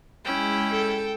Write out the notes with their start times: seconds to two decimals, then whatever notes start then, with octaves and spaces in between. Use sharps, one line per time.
0.25 G#3 C#4 E4 G5
0.71 A4